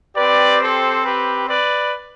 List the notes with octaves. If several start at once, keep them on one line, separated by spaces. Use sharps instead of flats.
C4 G4 B4 D5
A4 C5
G4 B4
B4 D5